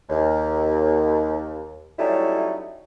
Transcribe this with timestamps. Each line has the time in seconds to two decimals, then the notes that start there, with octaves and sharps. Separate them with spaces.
0.10 D#2
1.99 F#3 G3 A3 C#4 D#4 E4